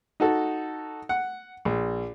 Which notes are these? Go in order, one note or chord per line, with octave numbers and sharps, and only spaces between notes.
D#4 F#4 A4
F#5
A#1